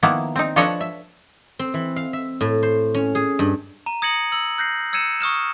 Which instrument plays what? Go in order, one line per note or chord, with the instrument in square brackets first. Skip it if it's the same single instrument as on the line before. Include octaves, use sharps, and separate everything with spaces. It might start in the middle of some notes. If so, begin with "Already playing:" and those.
[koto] D#3 F3 A#3 B3 E4
C4 D#4
F3 D4 A4 B4 C#5 D#5
E5
[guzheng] C4
E3
F5
E5
A2
C5
C#4
G#4
G2
[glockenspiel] A#5 D#7
D#6 G#6 A#6 C#7 D#7 F#7
E6 F#7
F#6 G6 A#6 C7
E6 G#6 C#7 D#7 E7
C#6 D#6 F6 E7